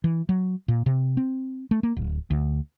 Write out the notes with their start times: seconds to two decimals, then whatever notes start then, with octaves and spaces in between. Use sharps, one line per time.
0.04 E3
0.29 F#3
0.68 A#2
0.86 C3
1.17 C4
1.71 A3
1.83 A#3
1.97 D1
2.31 D2